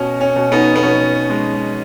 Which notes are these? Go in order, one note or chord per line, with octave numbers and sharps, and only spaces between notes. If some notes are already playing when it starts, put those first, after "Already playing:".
Already playing: B2 C#4
C#4
B2
B3 D#4
B3
B2 C#4
G#3